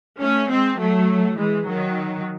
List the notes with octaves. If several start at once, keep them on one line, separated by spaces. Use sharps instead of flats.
A3 C#4
G#3 C4
F#3 A3
E3 G#3
D#3 F#3